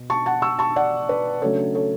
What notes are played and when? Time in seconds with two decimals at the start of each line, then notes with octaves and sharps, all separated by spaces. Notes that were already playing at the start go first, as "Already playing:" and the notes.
Already playing: B2
0.10 A5 C#6
0.26 F#5 A5
0.42 C#6 E6
0.59 A5 C#6
0.76 D5 F#5
1.09 B4 D5
1.41 C#3 F#3 A3 D4 A4 C#5
1.75 A4 C#5